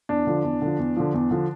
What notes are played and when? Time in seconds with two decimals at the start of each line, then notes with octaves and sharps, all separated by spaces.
0.09 E2 D4
0.27 D3 F3
0.44 E2
0.62 D3 F3
0.79 E2
0.97 D3 F3
1.14 E2
1.31 D3 F3